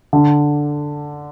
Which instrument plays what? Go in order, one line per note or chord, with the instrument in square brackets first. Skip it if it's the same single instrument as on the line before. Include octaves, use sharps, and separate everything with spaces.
[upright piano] D3